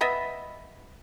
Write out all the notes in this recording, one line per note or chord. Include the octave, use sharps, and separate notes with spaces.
B3 D#5 E5 B5